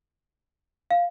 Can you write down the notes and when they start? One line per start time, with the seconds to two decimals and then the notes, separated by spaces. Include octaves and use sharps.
0.91 F5